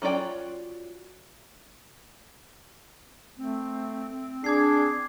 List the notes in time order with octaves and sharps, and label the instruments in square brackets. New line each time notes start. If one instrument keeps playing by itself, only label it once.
[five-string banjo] F#3 C#4 F4 D5 G5
[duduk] A3 [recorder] C4
[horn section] D4 [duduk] G#4 [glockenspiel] D6 G#6 C7